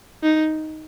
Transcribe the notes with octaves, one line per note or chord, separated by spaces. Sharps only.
D#4